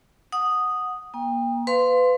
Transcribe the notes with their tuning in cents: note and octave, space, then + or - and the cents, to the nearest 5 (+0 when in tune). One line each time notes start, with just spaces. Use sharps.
F#5 -10 D#6 -5
A#3 +30 G5 +30
B4 +30 F5 +0 C6 -5